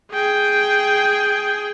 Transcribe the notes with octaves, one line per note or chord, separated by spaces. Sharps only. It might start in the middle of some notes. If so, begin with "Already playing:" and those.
G#4 G5